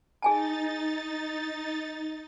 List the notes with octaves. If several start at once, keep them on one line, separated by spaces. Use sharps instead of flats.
D#4 G#4 G#5 A5 A6